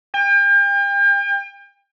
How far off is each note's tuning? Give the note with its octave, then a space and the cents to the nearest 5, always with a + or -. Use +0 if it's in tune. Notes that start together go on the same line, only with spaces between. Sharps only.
G5 +40